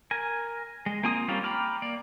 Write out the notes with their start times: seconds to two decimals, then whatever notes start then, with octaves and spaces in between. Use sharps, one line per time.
0.11 A#4 G#5
0.86 G#3
1.03 A#3 C4 F4 G#5 D#6
1.28 G3 A#3 C4 C#4 F4
1.44 G5 A#5 B5 D6 F6
1.82 A#3 D5